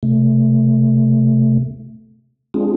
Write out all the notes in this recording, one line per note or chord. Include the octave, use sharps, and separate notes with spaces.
C3 A3
G#3 C4 D4 F4 G#4